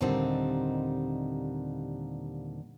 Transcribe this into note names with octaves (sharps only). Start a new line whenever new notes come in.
D#2 A#2 D3 G3 C4 D#4